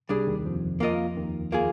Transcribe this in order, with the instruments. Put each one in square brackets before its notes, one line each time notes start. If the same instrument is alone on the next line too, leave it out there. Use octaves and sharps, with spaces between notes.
[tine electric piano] C2 C3 [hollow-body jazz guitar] G3 D4 G#4
[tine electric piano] D#2 D#3
F2 F3
[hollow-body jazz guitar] A#3 F4 A#4 D#5
[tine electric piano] D#2 D#3
[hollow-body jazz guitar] A#3 F4 G#4